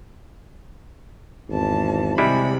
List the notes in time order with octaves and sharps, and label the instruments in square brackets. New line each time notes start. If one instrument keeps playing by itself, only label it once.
[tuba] G#1 [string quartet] E2 A5
[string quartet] C3 B5 [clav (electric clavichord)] G3 G#3 E4